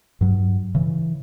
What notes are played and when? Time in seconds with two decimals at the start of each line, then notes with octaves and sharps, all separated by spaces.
0.21 G2 F#3
0.75 C#3 E3